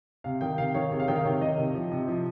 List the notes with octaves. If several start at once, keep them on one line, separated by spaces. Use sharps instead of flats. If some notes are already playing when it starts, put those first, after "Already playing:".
C3 F5
D#3 G5
C3 F5
D#3 C#5
C3 G#4
F5
D#3 G5
F5
C3 C#5
D#3 D#5
C3
F3
C3
F3